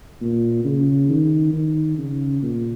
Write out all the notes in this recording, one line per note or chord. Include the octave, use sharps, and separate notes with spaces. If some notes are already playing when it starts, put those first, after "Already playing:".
A#2
C#3
D#3
D#3
C#3
A#2